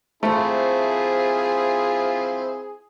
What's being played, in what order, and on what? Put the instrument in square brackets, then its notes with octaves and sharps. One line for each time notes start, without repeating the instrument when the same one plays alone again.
[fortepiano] A3 [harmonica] C4 E4 F4 [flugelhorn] G#4 [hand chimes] C5 E5